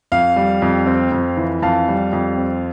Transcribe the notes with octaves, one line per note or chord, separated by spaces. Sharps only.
F2 F5
G3
F2
C4
F2
E3
F2 F5 A5
G3
F2
C4